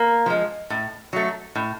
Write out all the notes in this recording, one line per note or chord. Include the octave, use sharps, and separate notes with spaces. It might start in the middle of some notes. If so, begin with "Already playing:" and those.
Already playing: A#3
F3 G#3
A2
F#3 A3
A2